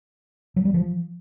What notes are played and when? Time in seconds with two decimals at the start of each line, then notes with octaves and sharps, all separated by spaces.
0.56 F#3
0.65 G3
0.74 F3